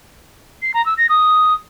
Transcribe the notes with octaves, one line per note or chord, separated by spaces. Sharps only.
C7
A#5
E6
A#6
D#6